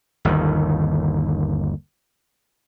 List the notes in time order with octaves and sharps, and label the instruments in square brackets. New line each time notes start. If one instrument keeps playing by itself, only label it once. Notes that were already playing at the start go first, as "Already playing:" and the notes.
[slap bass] G1 D#2 D#3